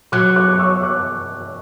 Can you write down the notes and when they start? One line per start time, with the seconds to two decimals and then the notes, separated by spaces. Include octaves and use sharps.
0.12 F#3 D6 F#6
0.36 D6 F#6
0.59 C#6 E6
0.83 D6 F#6